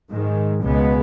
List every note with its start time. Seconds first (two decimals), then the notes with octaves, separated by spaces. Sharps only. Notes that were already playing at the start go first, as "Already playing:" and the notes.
0.12 G#2 D#3 G#3
0.64 C#2 B2 G#3 B3